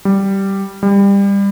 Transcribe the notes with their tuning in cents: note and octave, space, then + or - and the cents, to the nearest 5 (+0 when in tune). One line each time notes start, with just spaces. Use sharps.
G3 -5
G3 +25